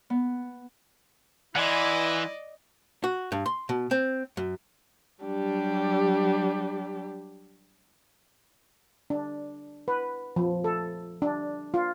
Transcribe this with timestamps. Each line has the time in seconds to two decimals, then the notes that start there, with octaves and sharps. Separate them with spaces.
0.10 B3
1.55 E3 E4 D5 D#5 F#5 G#5 C6
3.04 F#4
3.32 G2
3.46 C6
3.69 B2
3.91 C4
4.37 F#2
5.22 F#3 G3 D4 G4
9.10 D4
9.88 B4
10.36 F3
10.64 A4
11.22 D4
11.74 F4